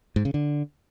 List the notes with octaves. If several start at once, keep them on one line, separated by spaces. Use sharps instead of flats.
G#2
C#3
D3